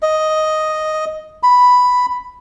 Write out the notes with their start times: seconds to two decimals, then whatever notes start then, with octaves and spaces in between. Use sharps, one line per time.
0.02 D#5
1.43 B5